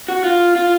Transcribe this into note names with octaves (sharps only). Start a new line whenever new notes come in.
F#4
F4
F4